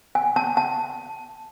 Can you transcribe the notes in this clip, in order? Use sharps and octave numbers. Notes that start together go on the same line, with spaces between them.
G#5
A5
A5